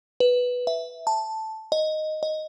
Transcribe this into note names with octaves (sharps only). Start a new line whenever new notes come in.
B4
E5
A5
D#5
D#5